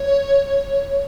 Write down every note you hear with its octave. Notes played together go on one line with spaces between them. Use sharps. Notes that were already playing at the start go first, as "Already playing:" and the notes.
Already playing: C#5